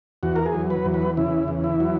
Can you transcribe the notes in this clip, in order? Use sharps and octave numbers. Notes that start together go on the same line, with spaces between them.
E2 F#4
A#4
G#4
F#3
B4
E2
B4
C#3 E4
E2
E4
F#3